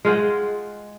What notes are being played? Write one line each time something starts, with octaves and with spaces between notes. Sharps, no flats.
G#3 F4 F#5 G5